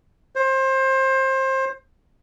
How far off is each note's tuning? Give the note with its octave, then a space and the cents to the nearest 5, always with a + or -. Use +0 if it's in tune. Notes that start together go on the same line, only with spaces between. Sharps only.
C5 +25